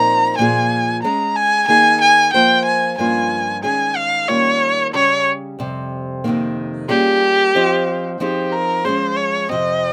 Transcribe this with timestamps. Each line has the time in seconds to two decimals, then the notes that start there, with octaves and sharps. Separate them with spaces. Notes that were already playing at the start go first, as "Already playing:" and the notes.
Already playing: A#2 F3 C4 D#4 A#4 A#5
0.38 A#2 F3 A#3 F4 G#4 G#5
1.03 G#3 C#4 G#4 A#5
1.36 G#5
1.68 D#3 A#3 D#4 G#4 G#5
2.01 G#5
2.34 F3 A#3 F4 C5 G5
2.66 G#5
2.98 G2 F3 A#3 C#4 F4 G#5
3.64 D#3 G#3 C#4 G#4 G#5
3.96 F5
4.28 D#3 G3 A#3 C#4 F4 C#5
4.94 C#3 G3 C#4 G4 C#5
5.59 F2 C3 G3 C4
6.24 F2 C3 D#3 A#3
6.89 G3 A#3 C#4 F4 G4 G#4
7.55 F3 C4 F4 C5 D#5
8.20 F3 C4 D#4 G4 G#4
8.53 A#4
8.85 F3 G#3 C#4 G#4 C5
9.17 C#5
9.49 F2 C3 F3 C4 D#5